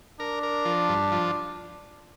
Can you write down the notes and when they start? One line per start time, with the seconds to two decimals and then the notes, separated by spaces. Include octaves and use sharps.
0.20 D4 A#4
0.43 A#4
0.65 F3
0.89 G2
1.12 F3